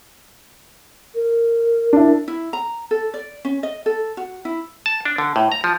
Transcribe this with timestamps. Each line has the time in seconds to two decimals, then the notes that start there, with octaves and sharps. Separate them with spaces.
1.15 A#4
1.93 D4 E4
2.28 E4
2.53 A#5
2.91 A4
3.14 D5
3.45 C#4
3.63 D#5
3.86 A4
4.17 F#4
4.45 E4
4.86 A5
5.05 D4
5.18 D3
5.36 A2
5.52 A#5
5.64 F3